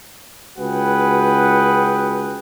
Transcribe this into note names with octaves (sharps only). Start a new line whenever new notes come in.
C#2 F#4 G#4 B4 F#5 G5